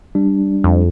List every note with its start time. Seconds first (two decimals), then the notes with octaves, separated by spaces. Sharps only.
0.15 G3 D4
0.64 F2